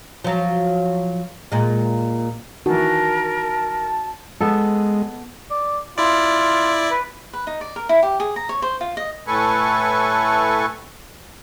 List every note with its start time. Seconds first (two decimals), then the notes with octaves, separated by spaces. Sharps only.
0.24 F3 F#3
1.52 A#2 G#3
2.66 D#3 E3 F#4 A#4 A5
4.41 G#3 B3 A4
5.51 D5
5.98 E4 F4 D5
6.91 B4
7.33 B4
7.47 D#4
7.61 D5
7.76 A#4
7.89 E4
8.03 G4
8.20 G#4
8.36 A#5
8.49 C#5
8.62 C5
8.81 F4
8.97 D#5
9.27 A2 A3 A4 B4 G#5 C#6